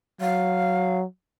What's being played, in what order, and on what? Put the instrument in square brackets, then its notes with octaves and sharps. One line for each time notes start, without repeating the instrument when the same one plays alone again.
[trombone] F#3 [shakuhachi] F5